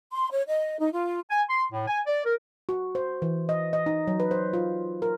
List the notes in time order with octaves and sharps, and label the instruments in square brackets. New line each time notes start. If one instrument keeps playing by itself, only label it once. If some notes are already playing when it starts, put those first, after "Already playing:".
[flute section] C6
C#5
D#5
D#4
F4
[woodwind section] G#5
C6
A2
G#5
D5
A#4
[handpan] F#4
C5
E3
D#5
D#5
D#4
F#3
B4
C5
F4
A#4